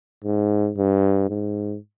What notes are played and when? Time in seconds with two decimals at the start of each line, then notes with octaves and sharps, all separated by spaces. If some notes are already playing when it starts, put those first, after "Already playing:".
0.24 G#2
0.77 G2
1.29 G#2